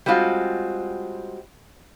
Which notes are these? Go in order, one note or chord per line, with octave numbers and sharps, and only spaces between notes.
G3 G#3 C4 F4 F#4